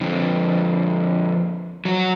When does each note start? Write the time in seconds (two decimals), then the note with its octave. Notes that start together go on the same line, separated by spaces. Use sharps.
0.01 F2 D3
1.85 F#3 F#4